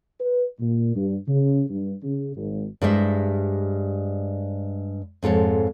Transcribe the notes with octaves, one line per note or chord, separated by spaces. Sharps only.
B4
A#2
G2
C#3
G2
C#3
G#1
G2 G3 G#3 C5 E5
F2 G#2 A4 C#5